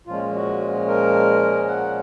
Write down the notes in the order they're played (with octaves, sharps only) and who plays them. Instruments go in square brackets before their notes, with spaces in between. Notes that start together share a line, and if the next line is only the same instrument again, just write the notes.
[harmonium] A#2 F3 G#3 C#4 F4
F#4
A#4
F#5